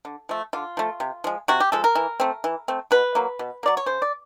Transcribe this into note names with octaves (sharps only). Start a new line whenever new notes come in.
D3
F3 A3
D3 F4
F3 A3
C3
F3 G#3
C3 F#4
G4
F3 G#3 A4
A#4
E3
A3 C4
E3
A3 C4
B2 B4
F#3 A#3
B2
A#3
F#3 D5
C#5
C#3 C5
D5